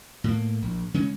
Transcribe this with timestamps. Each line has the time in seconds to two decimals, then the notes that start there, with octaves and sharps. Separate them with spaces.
0.24 A2 A#3
0.62 A#1
0.94 C#3 G#3 C#4